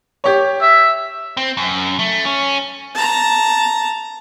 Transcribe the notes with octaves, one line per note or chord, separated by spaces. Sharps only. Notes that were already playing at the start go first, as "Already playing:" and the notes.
G4 C#5
E5
C4
F#2
A3
C#4
A5 A#5